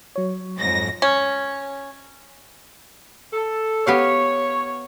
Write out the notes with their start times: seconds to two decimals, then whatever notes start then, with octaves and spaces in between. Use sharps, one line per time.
0.16 F#3 C#5
0.57 F2 G#2 A#6
1.02 C#4
3.33 A4
3.87 B3 G4 C#5 F5